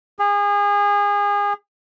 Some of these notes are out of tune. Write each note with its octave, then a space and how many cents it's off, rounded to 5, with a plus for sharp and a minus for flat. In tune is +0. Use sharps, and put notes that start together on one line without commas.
G#4 -30